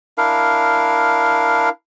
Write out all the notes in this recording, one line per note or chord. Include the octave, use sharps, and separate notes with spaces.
D4 E4 A#4 F5